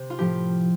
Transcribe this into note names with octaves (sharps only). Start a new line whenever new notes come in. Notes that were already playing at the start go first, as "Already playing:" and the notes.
Already playing: C3 C5
F4
A2 F3 G4